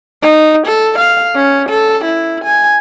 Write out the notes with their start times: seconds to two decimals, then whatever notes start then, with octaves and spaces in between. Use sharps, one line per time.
0.22 D#4
0.67 A4
0.98 F5
1.35 C#4
1.69 A4
2.04 E4
2.44 G#5